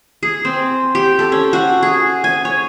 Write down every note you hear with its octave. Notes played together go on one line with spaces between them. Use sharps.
G#4
C4
G4
A4
C#4
F#4
G#4
G#5
C#5